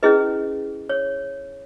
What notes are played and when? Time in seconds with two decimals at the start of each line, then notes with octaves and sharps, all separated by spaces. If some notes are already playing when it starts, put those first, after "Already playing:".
0.03 C#4 E4 G#4 B4 D#5
0.89 C#5